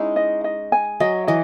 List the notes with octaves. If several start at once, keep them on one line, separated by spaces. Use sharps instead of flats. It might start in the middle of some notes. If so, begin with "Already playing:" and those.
Already playing: G#3 C#4 D#4 E4
D#5
D#5
G#5
F#3 D#5
E3 D#5